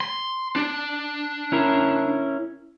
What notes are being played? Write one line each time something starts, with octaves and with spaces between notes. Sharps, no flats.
C6
D4
C#4 E4 A#4